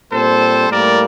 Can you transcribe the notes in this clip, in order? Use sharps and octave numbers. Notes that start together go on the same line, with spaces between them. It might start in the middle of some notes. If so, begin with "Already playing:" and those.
A#2 G3 C4 A4 C5
A2 G3 A#3 A#4 D5